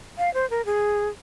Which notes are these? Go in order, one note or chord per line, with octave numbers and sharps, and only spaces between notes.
F5
C5
A#4
G#4